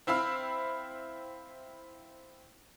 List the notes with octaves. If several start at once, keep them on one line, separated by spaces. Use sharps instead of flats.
C4 E4 F5 B5 E6